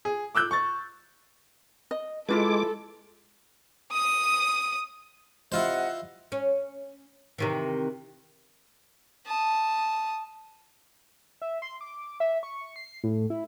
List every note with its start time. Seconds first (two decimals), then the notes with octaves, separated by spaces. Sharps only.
0.05 G#4
0.35 D6 E6 F#6 G6
0.51 C#6 A6
1.91 D#5
2.29 G#3 E4 F4 A4 B4 D6
3.92 D#6 D#7
5.52 C3 E4 F4 C5 D#5 F#5
6.32 C#4
7.38 C3 D#3 E3
9.26 A5 D#6
11.42 E5
11.62 C6
11.81 D6
12.20 E5
12.43 C#6
12.76 C7
13.04 A2
13.30 E4